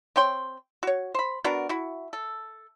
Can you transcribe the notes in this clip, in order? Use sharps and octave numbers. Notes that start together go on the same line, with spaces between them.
C4 C#5 G5 C6
F#4 C#5
C5 B5
B3 D4 F#4 A#4
E4 F#4
A4